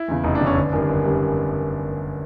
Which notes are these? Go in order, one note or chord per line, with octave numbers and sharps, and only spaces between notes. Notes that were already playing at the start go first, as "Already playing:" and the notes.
Already playing: E4
E2 C#3
F1 D#4
D4
E2 C#3
C#4
G1 D4
F#2 D#3 G3
G1
F#2 D#3 G3